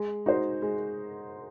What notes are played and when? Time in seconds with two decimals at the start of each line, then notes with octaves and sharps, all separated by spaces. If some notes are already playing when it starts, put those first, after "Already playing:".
Already playing: G#3
0.26 D#4 F#4 C5
0.62 G#3